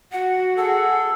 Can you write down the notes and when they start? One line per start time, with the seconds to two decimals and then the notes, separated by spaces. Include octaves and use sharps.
0.12 F#4 F#5
0.57 G#4 A4 F#5